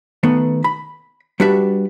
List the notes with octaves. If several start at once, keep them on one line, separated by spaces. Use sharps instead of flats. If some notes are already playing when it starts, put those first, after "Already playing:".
D#3 A3 B3
B5
G3 D4 F#4 B4 E5